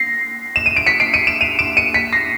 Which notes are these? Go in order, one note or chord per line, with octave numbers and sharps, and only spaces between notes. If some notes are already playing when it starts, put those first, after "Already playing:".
Already playing: A#6 C7
E7
D#7
D7
B6 C#7
C7 D7
C#7 D#7
D7 E7
D#7 F7
D7 E7
C#7 D#7
B6 C#7
A#6 C7